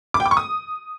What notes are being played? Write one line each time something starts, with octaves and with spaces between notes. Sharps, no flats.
D6
G5
D6
C#6
D#6